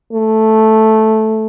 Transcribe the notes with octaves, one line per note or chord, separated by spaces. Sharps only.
A3